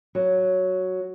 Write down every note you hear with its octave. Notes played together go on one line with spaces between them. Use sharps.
F#3